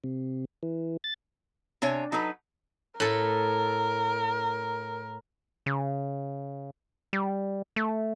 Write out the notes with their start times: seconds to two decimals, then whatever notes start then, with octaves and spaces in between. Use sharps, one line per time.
0.04 C3
0.63 E3
1.04 A6
1.82 C3 D4 C#5 E5 G#5
2.12 F#3 D#4 A4 B4
3.00 A2 A4 A#4
5.66 C#3
7.13 G3
7.76 A3